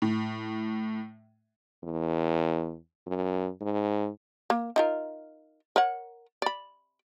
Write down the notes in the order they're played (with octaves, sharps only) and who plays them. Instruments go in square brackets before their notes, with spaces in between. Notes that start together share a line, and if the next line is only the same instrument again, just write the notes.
[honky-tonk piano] A2
[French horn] E2
F#2
G#2
[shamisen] A#3
D#4 F4 A#4
A#4 C#5 F#5
D5 B5